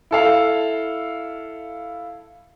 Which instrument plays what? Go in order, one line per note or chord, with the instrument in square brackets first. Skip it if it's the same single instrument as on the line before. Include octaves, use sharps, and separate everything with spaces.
[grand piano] E4 A4 F5